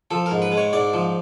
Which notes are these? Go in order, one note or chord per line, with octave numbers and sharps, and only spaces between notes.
F3 A4
A#4
G#2
B4
G#3
C#5
G#2 D5
F3